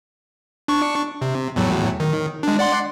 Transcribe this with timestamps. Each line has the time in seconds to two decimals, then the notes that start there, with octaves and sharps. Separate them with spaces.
0.68 D4 C#6
1.22 C3
1.56 E2 A2 F#3
2.00 D#3
2.43 G#3 D4
2.59 D5 F#5 C6